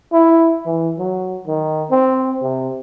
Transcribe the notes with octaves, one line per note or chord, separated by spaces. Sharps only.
E4
E3
F#3
D#3
C4
C3